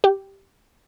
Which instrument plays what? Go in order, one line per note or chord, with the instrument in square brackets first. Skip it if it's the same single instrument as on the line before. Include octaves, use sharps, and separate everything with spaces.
[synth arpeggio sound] G4